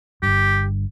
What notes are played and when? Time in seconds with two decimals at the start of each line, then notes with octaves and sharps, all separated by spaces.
0.23 G1 G2 G4